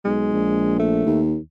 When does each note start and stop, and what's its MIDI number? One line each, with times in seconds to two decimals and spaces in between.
0.05 0.29 35
0.05 0.78 56
0.33 1.02 34
0.79 1.21 57
1.06 1.37 39